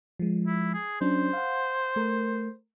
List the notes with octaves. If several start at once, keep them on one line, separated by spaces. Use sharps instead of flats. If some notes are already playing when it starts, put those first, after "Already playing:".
F3 G#3
E4
G#4
F#3 C#4 D4 C5
F5 F#5
A3 A#4